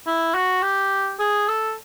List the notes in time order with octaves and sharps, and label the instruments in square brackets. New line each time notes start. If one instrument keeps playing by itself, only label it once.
[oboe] E4
F#4
G4
G#4
A4